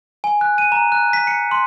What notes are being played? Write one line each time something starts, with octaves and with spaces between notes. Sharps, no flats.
G#5
F#6
D#7
A#5
F#6
B6
C#7
C6